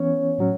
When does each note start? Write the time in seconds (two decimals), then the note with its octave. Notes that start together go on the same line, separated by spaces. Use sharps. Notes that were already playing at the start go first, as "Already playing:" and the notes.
Already playing: E3 B3 C#4 C#5
0.38 A2 F#3 C#4